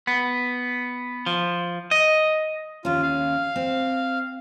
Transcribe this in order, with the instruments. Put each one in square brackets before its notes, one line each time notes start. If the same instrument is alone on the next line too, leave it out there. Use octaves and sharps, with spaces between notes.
[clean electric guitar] B3
F3
D#5
[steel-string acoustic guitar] D#2 C#4 [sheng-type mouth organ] F4
[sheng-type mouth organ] F5
[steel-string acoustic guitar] C4